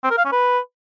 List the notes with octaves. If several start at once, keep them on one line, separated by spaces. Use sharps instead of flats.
C4
A#4
F5
C#4
B4